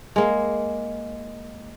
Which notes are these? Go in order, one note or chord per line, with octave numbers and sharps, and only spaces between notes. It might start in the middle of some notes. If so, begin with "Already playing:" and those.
G#3 A#3